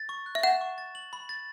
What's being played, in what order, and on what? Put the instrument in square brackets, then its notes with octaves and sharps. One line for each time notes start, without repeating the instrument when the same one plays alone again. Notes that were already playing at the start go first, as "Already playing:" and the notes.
Already playing: [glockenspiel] A6
C#6
F#6
[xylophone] E5
[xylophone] F#5 [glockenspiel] E7
[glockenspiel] C#6
A6
F#7
B5
A6